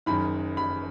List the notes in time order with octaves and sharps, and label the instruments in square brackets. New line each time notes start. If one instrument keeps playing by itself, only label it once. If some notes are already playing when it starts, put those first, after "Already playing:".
[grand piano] F#1 F#2 D#3 [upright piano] B5
[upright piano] B5